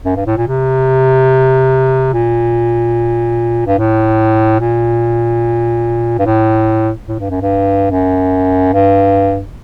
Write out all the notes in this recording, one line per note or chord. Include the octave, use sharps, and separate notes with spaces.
F#2
G2
A2
A#2
C3
A#2
G2
A2
A#2
G2
A2
A2
G2
F#2
G2
F#2
G2